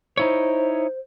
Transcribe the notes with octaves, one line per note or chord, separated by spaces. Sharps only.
D#4 E4 C5 C#5